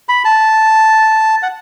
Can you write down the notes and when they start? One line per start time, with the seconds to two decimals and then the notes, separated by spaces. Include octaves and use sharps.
0.09 B5
0.25 A5
1.43 F#5